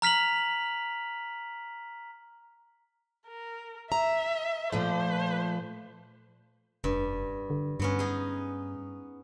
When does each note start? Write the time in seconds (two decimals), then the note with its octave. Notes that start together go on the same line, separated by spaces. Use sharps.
0.02 A#5 F6 B6 F7 F#7
3.27 A#4
3.92 E5 A#5
4.72 A#2 F3 A3 C5
6.84 F1 G2
7.50 D3
7.80 G2 F#3 B3 C#4
7.99 D#4 G#4